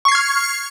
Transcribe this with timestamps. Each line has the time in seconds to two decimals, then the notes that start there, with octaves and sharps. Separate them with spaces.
0.05 C#6
0.08 C7
0.12 G#6
0.15 F6